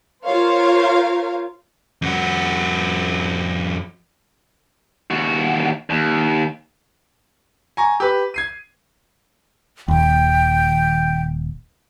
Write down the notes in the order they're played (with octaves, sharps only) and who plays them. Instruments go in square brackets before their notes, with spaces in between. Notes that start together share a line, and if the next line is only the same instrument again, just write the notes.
[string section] F4 A#4 C5 C#5 F5
[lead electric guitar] F2 F#4
D#2 F#4
D#2
[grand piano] G#5 A#5 C#6
G4 B4
G#6 C7 D#7
[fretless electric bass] D#1 D#2 [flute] G5